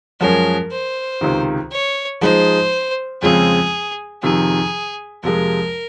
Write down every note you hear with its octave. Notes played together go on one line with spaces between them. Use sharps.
F#2 F3 G#3 C#4 G#4 A#4
C5
C#2 C3 D#3
C#5
F3 G#3 D#4 C5
F2 C#3 G#3 C4 G#4
F2 C3 D#3 G#4
F2 C3 F3 G#3 A#4